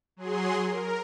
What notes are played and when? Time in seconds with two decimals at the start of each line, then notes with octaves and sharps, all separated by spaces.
0.16 F#3 G#4 C6
0.67 A#4